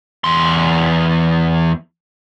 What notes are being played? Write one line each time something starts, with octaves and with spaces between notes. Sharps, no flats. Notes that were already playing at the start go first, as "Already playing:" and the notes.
E2 C6